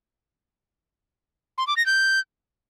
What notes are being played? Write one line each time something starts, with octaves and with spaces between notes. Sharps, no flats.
C6
D6
A#6
G6